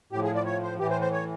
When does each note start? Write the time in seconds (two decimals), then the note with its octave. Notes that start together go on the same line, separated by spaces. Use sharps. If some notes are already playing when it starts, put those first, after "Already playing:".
0.12 A2 F3 G4
0.23 G#4
0.35 D5
0.46 C#5
0.63 C5
0.79 A2 E3 G4
0.90 C5
1.01 C5
1.12 C#5